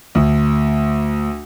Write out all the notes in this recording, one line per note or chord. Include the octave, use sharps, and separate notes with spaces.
D2